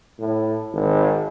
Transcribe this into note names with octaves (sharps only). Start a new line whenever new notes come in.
A2
G#1